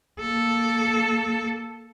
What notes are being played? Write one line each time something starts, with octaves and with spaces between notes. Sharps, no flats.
A#3 A4